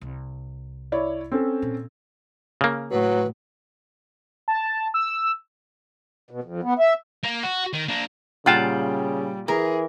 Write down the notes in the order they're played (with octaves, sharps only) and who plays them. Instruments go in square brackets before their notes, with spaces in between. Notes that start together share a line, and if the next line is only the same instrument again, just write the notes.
[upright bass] C2
[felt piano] E4 C#5 D5
C4 C#4 A4
[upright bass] A#2
[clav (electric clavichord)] C#3 A#3
[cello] A2 [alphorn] F#3 [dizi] B4
[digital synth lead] A5
E6
[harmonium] B2
F2
B3
E5
[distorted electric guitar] A#3
F#4
D#3
A#3 D4
[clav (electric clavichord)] A#2 F4 A5 [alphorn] C#3 [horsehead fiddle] G3 [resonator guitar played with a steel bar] F#5 G5
[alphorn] E3 [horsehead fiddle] G#4 [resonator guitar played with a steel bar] A#4